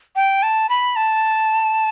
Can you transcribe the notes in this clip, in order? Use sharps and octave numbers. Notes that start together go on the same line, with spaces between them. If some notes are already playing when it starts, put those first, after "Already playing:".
G5
A5
B5
A5